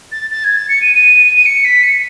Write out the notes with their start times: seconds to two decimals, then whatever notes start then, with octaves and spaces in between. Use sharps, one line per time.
0.12 A6
0.31 A6
0.44 G#6
0.56 A6
0.69 C#7
0.82 D#7
0.95 D#7
1.37 D#7
1.46 C#7
1.65 B6
1.83 C#7